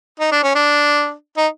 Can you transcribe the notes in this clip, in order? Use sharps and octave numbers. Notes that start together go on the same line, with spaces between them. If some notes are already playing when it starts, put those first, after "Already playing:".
D#4
D4
C#4
D4
D#4